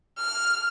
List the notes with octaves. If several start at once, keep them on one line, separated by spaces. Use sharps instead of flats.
F6